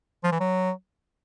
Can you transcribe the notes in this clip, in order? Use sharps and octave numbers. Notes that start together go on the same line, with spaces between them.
F3
E3
F#3